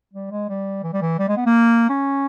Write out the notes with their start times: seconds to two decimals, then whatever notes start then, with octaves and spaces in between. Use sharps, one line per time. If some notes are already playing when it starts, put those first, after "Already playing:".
0.14 G3
0.31 G#3
0.49 G3
0.83 E3
0.94 G3
1.01 E3
1.19 G3
1.29 G#3
1.37 B3
1.46 A#3
1.89 C#4